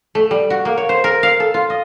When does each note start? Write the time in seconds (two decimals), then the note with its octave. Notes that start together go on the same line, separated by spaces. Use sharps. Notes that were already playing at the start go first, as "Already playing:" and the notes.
0.15 A3
0.31 G3
0.50 F#4
0.65 A#3
0.78 C#5
0.89 C5
1.04 A#4
1.23 F5
1.40 A4
1.54 F4
1.70 D#5